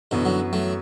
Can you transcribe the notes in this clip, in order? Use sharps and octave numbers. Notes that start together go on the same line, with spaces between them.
F#2 B2 D3 E3 B3 F#4
D3 F#3
F#3 A3